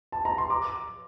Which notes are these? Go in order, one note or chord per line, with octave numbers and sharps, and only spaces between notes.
A5
A#5
C6
A#5 D6